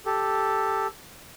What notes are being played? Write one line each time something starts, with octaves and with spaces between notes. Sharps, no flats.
G4 A4